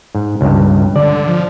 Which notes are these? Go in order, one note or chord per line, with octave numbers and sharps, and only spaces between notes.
G#2
C#2 G2
D3 D5
F3